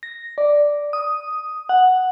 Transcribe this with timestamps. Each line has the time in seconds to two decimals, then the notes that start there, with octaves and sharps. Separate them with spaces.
0.03 A#6
0.38 D5
0.93 D#6
1.69 F#5